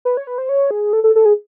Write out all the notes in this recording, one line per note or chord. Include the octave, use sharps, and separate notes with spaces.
B4
C#5
B4
C5
C#5
G#4
A4
A4
A4
G#4